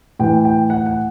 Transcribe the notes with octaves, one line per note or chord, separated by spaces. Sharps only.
A2 E3 G5
G5
F#5
F#5